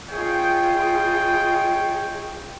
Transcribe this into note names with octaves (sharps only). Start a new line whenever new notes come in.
F4 G#4 C#5 D#5 G5